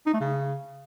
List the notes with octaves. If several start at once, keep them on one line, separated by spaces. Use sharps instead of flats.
D#4
A3
C#3